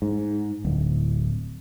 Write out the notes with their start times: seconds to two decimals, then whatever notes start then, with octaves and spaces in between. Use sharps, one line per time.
0.02 G#2
0.65 D1